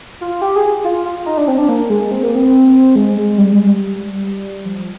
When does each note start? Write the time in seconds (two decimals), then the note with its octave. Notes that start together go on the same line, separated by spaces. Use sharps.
0.21 F4
0.42 G4
0.56 G#4
0.84 F4
1.05 F4
1.26 D#4
1.38 D4
1.48 C4
1.58 D4
1.69 A#3
1.90 G#3
2.11 C4
2.23 A#3
2.35 C4
2.96 G#3
3.17 G#3
3.38 G3
3.52 G#3
3.66 G3
4.65 F3